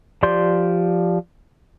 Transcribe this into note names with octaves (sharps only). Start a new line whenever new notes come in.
F3 G4 D5 C6 G6